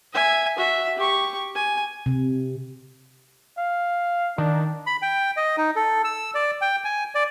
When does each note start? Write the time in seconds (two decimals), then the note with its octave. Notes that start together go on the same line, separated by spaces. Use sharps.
0.13 E5 G#5
0.58 F#4 E5
0.97 G4 C#6
1.55 G#5
2.06 C3
3.58 F5
4.38 D#3 D4
4.86 B5
5.02 G5
5.37 D#5
5.57 D#4
5.76 A4
6.04 E6
6.35 D5
6.61 G5
6.84 G#5
7.15 D5